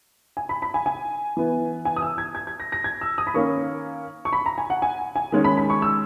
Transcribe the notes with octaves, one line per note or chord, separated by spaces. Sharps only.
G#5
B5
B5
G#5
G#5
E3 B3
G#5
D#6
E6
G#6
G#6
G#6
A#6
A#6
G#6
E6
D#6
B5
D#3 A#3 C#4 C#6
C#6
B5
A#5
G#5
F#5
G#5
G#5
D#3 G#3 C#4
B5
B5
C#6
E6